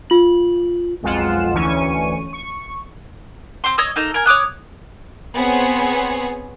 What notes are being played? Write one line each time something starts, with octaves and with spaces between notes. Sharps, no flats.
F4 F#7
B1 F2 G#3 F4 F#5 E7
D2 E3 C#4 C#6 D#7
C#6
C4 C6
C#5 D#5 D#6 E6
A#3 D#4 A4
A#4 G#5
C#5 D6 D#6 F#6
B3 C4 G#4 C5 C#5